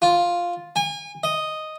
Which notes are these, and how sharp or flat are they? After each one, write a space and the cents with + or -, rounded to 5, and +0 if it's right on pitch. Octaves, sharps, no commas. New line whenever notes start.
F4 +5
G#5 -35
D#5 +0